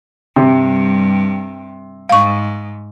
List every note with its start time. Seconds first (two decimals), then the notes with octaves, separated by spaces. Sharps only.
0.36 G2 C3 G3
2.09 G#2 F5 C#6